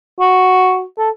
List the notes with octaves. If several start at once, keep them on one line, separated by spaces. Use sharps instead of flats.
F#4
A4